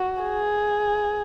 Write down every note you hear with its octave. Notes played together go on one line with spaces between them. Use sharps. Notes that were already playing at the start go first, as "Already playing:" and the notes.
Already playing: F#4
G#4